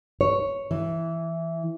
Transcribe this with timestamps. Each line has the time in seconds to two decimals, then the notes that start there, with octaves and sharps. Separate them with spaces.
0.21 C#5
0.71 E3